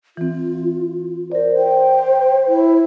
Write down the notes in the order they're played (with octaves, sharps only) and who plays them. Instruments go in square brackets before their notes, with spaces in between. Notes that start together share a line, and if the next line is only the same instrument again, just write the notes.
[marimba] E3 C4 [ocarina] F4
[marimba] A#4 D5 [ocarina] C5
[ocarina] C5 [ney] G5
[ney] E4